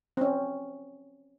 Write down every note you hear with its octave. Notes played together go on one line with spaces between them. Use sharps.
C4 C#4